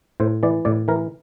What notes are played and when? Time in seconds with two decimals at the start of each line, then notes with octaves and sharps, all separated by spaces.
0.20 A2 C5
0.43 E3 D5
0.65 A2 D5
0.88 E3 A#4